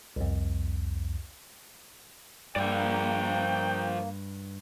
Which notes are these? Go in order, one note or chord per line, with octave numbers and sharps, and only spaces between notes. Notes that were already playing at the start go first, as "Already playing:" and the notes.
C2 F2
G2 F3 A#3 D5 G5